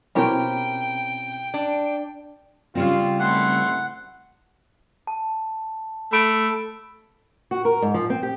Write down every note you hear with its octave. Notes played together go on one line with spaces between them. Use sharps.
B2 C4 C#4 E4 G4 A#4 G5
D4
C#3 G3 C4 F4
G#1 G#2 A3 E4 F#5 C6
A5
A3 B5 E6 D7
F#4
A#4
G#2
F3
C4
G4